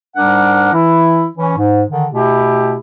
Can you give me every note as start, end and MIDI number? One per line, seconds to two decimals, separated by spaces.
0.16 0.72 44
0.16 0.72 55
0.16 0.72 62
0.16 0.72 70
0.16 0.72 78
0.72 1.25 52
0.72 1.25 64
1.36 1.54 52
1.36 1.54 61
1.57 1.82 44
1.89 2.05 50
1.89 2.05 51
2.10 2.75 47
2.10 2.75 57
2.10 2.75 64
2.10 2.75 67